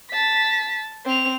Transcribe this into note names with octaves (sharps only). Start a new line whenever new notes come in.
A5 B6
C4 F7